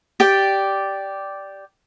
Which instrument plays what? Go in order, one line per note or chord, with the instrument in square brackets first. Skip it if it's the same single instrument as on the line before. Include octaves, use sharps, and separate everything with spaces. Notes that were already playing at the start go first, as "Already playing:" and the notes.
[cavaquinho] G4 D5 G5